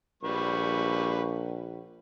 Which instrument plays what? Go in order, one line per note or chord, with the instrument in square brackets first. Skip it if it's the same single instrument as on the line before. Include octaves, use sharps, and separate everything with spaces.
[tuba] A#1 [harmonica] G3 B4 C#6